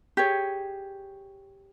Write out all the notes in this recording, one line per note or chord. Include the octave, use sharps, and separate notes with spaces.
G4 G#4 C#5